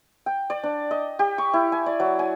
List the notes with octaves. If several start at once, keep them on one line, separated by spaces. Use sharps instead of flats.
G5
D5
D4
D#5
G4
C#6
E4
G#5
D5
F#3
G#5